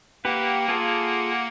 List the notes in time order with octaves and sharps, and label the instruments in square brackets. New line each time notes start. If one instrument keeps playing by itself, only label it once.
[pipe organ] A#3 F#5 [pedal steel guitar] G4 B4
[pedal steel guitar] F4 G#4 A4